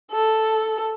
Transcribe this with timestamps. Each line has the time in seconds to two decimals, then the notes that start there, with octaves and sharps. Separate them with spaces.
0.11 A4